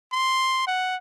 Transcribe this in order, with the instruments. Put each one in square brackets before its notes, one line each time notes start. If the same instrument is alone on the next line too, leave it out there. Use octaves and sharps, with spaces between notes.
[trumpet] C6
F#5